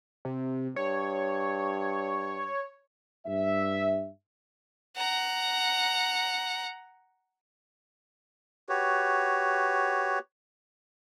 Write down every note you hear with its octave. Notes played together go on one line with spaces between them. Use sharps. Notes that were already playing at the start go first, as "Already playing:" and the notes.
C3
G2 C#5
G2 E5
F#5 A#5
F#4 G4 B4 C#5